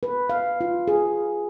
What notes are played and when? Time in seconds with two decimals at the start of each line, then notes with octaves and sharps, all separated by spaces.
0.03 B4
0.29 F5
0.61 F4
0.88 G#4